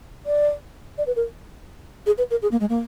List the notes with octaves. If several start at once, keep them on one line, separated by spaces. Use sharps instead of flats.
D5
D5
B4
A#4
G#4
B4
A#4
G#4
A#3
G#3
A#3